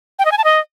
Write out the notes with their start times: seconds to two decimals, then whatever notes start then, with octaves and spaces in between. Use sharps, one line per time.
0.19 G5
0.25 D#5
0.32 G#5
0.38 A5
0.44 D#5